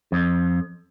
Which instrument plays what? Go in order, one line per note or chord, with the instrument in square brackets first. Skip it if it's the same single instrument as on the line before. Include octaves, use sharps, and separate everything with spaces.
[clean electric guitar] F2